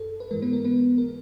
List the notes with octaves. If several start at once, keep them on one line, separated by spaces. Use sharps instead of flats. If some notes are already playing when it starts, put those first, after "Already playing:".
Already playing: F#2 A4
B4
G#2 E3 G#3 A#4
B3 B4
A#4
B3 B4
A#4